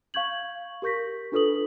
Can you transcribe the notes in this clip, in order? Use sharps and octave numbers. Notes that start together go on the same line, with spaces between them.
F5 C#6 G6 G#6 F#7
G4 A#4 C#6 G6 A#6 B6
D4 F4 A4 B4 D#6 F#7